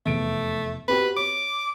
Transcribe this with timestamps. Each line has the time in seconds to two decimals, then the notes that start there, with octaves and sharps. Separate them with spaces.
0.06 F1 E2 A3 D7
0.88 C4 F#4 G4 B4
1.17 C#5 D6